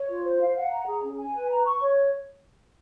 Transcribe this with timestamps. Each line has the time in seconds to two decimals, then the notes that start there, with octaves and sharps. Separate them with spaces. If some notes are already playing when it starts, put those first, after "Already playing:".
Already playing: C#5
0.10 F4
0.24 C5
0.40 F5
0.56 F#5
0.71 A#5
0.87 G#4
1.03 C#4
1.19 G#5
1.34 B4
1.50 A#5
1.66 C#6
1.81 C#5